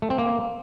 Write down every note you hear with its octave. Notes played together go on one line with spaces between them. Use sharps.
A3
C4
A#3